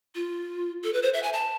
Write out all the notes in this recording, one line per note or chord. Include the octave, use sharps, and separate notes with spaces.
F4
A4
B4
C5
E5
G#5
A5